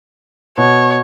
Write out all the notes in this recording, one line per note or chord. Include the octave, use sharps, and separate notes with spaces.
B2 C#5